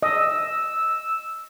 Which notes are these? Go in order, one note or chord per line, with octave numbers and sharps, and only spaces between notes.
D#5 E6